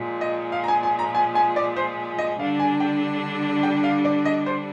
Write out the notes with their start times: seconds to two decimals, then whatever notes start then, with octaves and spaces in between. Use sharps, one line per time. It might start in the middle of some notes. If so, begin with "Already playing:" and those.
Already playing: A#2 F3 G#3
0.21 D#5
0.52 F5
0.64 A#5
0.68 G#5
0.83 G#5
0.99 A#5
1.15 G#5
1.35 G#5
1.56 D5
1.76 C5
2.19 D#5
2.39 D3 G3 D4 F5
2.59 G#5
2.80 G5
3.63 G5
3.84 F5
4.05 D5
4.25 D#5
4.46 C5